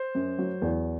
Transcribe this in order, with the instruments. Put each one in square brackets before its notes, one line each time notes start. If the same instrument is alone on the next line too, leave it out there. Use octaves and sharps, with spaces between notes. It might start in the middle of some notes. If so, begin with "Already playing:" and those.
Already playing: [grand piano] C5
[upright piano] F#2
F#3
E2